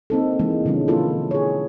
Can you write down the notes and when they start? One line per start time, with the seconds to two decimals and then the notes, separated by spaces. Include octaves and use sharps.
0.10 A#3 C4 D#4 A4
0.39 E3 G#3 A#3 D#4
0.65 B2 D3 F3 G#3 C#4
0.88 A#3 E4 F4 A4
1.31 G#4 C#5